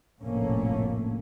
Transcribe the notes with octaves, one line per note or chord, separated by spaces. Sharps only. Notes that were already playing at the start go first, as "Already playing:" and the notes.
F1 A#1 A2 A3 A#3 C#4